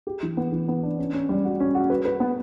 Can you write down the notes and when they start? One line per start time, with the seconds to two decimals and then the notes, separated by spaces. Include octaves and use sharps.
0.07 G4
0.23 E3
0.37 B3
0.52 E3
0.68 B3
0.83 D4
0.98 C#4
1.14 C#4
1.29 G3
1.45 F#4
1.60 C#4
1.75 F#4
1.90 B4
2.05 B4
2.20 B3